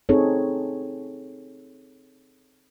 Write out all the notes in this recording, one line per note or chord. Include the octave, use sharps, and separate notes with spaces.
C4 D#4 G#4 A4 C#5